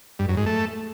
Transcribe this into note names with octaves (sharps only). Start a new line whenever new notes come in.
G2
F#2
G#2
A3